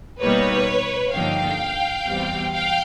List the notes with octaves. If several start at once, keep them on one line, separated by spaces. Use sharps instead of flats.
B2 G3 A#3 D#4 B4 C#5
G2 D3 F3 A#3 D#4 F5 G5
E2 B2 G3 C4
F5 G5